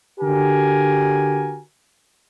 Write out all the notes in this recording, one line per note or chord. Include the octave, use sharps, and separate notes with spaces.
D3 F#4 G4 A#4 G#5